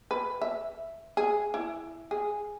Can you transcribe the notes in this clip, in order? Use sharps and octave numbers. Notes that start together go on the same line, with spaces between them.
B4
E5
G#4
E4
G#4